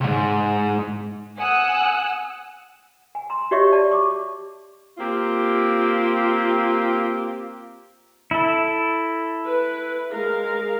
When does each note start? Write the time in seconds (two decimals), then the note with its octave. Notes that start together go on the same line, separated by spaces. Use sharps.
0.01 C#2 G#2
1.38 F#5 G#5 D#6 E6 F#6
3.15 G#5
3.30 A#5 C6
3.51 F#4 G4 C#5 D#5 E5 C#6
3.72 D5 A5
3.91 C#6 D6
4.98 A#3 C4 F4 G4
8.31 E4 A4
9.46 B4
10.11 G#3 A#4 F5